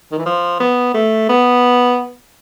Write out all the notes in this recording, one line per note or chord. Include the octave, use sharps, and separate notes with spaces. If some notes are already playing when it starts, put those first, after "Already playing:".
D#3
E3
F3
B3
A3
B3